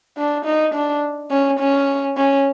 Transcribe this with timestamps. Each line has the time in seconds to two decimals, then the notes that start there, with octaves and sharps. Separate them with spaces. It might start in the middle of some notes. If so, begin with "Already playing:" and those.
0.18 D4
0.45 D#4
0.74 D4
1.31 C#4
1.60 C#4
2.17 C#4